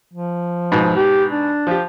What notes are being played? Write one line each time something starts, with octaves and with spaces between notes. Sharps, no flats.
F3
G#2 B2
G4
D4
F3 G4